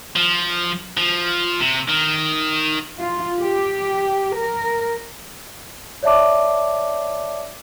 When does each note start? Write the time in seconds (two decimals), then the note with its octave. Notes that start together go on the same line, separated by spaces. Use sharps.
0.16 F3
0.97 F3
1.61 C3
1.89 D#3
2.98 F4
3.41 G4
4.36 A#4
6.03 C#5 D5 E5 A5 D6